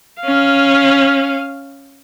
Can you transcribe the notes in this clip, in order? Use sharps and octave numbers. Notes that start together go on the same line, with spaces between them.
C#4 F5